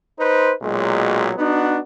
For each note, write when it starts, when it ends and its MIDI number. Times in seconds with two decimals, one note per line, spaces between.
0.18 0.52 63
0.18 0.52 71
0.18 0.52 72
0.63 1.32 35
0.63 1.32 46
0.63 1.32 54
0.63 1.32 56
1.37 1.79 59
1.37 1.79 62
1.37 1.79 63
1.37 1.79 66